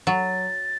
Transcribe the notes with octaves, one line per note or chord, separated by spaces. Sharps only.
F#3 A6